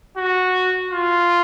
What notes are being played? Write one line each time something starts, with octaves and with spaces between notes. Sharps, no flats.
F#4
F4